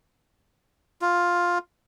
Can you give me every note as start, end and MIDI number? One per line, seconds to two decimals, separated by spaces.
1.02 1.58 65